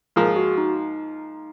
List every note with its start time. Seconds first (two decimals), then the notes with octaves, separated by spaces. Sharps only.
0.16 G#2 F3 A#3 F4 G#4 A#4
0.36 F#4
0.58 D#4